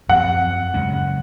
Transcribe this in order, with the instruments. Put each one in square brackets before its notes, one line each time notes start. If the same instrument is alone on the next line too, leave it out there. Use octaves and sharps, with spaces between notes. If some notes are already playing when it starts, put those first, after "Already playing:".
[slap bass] F#2 F3 C4 [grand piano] F#5
[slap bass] F#2 C#3 G#3 C#4